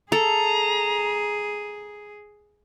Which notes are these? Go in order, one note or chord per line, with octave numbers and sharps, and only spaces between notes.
G#4 A4 A#5